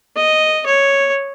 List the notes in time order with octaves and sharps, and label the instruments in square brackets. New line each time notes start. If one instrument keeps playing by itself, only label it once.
[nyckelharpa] D#5
C#5